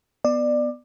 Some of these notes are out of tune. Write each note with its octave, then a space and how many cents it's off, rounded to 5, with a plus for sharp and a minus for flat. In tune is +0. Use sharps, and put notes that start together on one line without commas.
B3 +0 D5 +20